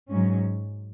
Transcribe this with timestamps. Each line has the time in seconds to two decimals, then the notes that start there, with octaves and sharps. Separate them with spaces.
0.10 G#2 F#3 C#4